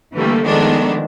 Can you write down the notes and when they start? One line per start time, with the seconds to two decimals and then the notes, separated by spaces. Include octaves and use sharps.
0.14 D3 E3 G3 A3 A#3
0.44 D#3 F3 G#3 A3 B3 D4